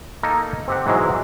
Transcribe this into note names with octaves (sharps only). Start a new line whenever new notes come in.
A#3 D#4 A4 A#4
C4 G4 F#5
G#2 B2 E3 F#3 G#3